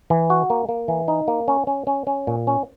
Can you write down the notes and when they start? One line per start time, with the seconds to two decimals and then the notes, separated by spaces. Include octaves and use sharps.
0.10 E3
0.30 F#4
0.50 A#3
0.69 A#3
0.88 E3
1.08 D#4
1.28 A#3
1.48 C#4
1.67 C#4
1.87 C#4
2.07 C#4
2.27 A#2
2.47 C#4